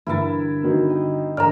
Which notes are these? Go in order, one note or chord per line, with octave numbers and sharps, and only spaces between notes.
G2 D3 E3 E4 A#4 E5 B5 A6
D#3 F#3 B3
D#5 G5
E1 G#2 D3 A#4 C#5 D5 A#5 F6